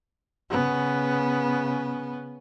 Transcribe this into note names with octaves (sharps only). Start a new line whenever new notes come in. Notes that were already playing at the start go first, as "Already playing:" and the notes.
C#3 B3